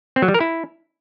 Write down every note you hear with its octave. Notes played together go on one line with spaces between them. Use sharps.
C4
F#3
G3
A#4
E4